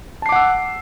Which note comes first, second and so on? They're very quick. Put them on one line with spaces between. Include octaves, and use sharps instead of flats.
A5 C7 D6 F#5 E6